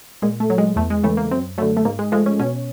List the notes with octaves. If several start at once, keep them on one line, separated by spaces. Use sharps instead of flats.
A#2 G#3
A3
F#3
G#3
E2 A3
G#3
C#3 E3 A3
A#3
F#2 C4
D3 F#3 A3
A3
G#2 A#3
G#3
F3 G#3 A3
C#4
B2 C#4